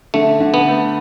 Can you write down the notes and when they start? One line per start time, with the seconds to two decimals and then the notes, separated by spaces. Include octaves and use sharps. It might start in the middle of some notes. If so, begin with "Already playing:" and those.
0.14 D3 A3
0.40 D3
0.54 B3
0.68 A3